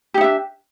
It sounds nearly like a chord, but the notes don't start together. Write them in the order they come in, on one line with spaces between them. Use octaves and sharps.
G4 D#4 E5 D4